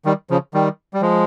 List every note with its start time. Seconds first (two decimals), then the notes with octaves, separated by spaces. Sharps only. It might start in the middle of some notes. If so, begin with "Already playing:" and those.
0.05 D#3 G3
0.30 C#3 F3
0.54 D#3 G3
0.94 G3
1.02 F3 G#3